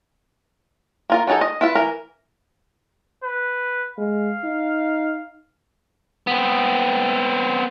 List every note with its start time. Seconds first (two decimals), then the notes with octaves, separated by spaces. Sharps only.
1.10 A#3 F4 A#4
1.27 F#3 D4 D#4 G#4 A4
1.41 D#5
1.61 E4 F4 B4 E5
1.75 E3 A#4
3.24 B4
3.98 G#3 F5
4.44 D#4
6.27 B3 C4